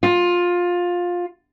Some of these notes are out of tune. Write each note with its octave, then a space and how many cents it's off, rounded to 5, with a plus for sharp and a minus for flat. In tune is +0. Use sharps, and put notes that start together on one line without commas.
F4 +15